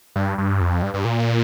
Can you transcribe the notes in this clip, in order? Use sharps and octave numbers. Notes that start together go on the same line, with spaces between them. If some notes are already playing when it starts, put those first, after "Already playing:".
G2
G2
F2
G2
G2
A#2